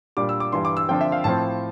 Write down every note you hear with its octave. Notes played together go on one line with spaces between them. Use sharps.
A#2 G3 D4 D6
E6
D6
G2 E3 G3 C6
D6
E6
D3 F3 C4 G5
E5
F5
A2 F3 C4 A5